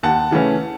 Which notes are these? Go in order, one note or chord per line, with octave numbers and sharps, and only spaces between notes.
D#2 F#5 A5
C#3 E3 A3 C#4